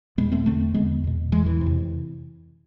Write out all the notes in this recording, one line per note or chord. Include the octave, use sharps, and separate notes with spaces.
E2 B2 G#3 B3
A3 C4
E2 D3 A3 C4
E2 D3 G#3 B3
E2 B2
E2 B2 E3 G#3
E3
F2
C3